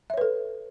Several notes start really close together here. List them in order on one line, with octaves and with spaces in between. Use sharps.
E5 C#5 B4 A4